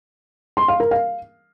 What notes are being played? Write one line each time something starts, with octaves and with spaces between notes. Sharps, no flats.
C6
F5
A#4
F5